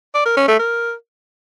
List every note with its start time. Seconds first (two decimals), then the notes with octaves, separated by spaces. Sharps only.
0.14 D5
0.26 A#4
0.37 C#4
0.48 A3
0.59 A#4